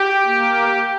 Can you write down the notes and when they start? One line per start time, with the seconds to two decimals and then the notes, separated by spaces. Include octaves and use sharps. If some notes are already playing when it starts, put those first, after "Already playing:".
Already playing: G4
0.26 A#3